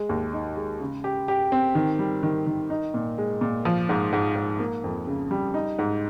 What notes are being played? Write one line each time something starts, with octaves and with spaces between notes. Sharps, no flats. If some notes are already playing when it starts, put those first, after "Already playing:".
Already playing: G#3
D#2
D#4
G#3
C#3
G4
G4
C4
D#3
G3
D#3
D#3
D#4
A#2
G#3
A#2
F3
G#2
G#2
G#2
A#3
F2
C#3
G3
D#4
G#2